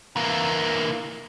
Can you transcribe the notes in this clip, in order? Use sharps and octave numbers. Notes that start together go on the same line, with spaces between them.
E3 A#3